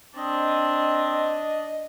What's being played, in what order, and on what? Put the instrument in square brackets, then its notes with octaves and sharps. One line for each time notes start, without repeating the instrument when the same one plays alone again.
[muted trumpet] C4 [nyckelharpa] D4 [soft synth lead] D#5